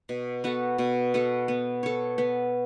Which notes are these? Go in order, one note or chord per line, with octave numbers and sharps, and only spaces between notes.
B2
B3 F#4 A4
B2
B3 F#4 A4
B3
A4 C#5
B3